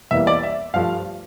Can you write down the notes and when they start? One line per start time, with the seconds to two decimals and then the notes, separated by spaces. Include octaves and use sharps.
0.11 E2 E3 G3 A#3 E5
0.27 D5
0.43 E5
0.74 G2 F3 A3 F5